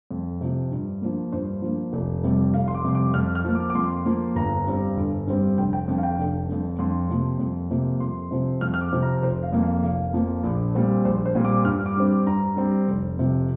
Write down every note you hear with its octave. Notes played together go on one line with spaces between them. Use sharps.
F2
C3 F3
G2
F3 A#3
G2 C5
F3 A#3
F1
F2 C3 G3
F1 F5
C6
D6
F2 C3 G3
D6
F2 F6
F6
F3 A#3
D6
D6
F2 C6
F3 A#3
G1 A#5
G2 G3 C4
G1
G2 G3 C4
F1 G5
G5
F2 D3
F5
G5
F1
F2 D3
F2 C6
C3 F3 A#3
F2
C3 F3 A#3
F2 C6
C3 F3 C4
F2 F6
F6
D6
C3 F3 C4
A#5
F1 C5
F5
F2 F3 A#3
F5
F1 F5
F2 F3 A#3
A#1
A#2 G3 C4
A#1 C5
C5
A#2 G3 C4
D6
G2 F6
D6
G3 C4
D6
G2 A#5
G3 C4
F1
F2 C3 F3